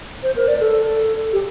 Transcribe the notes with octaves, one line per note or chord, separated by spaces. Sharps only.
C5
A#4
D5
A4
G4